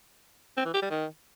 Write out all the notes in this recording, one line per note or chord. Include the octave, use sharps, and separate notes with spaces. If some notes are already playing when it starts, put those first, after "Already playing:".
C4
E3
G4
G3
D#3